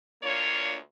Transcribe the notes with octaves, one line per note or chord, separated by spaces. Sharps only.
D2 A#3 D4 F4 C#5